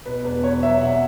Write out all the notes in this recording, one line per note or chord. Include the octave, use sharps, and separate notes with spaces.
B2 B4
E1 B4
E2 C#5
F#3 E5
B2 F#5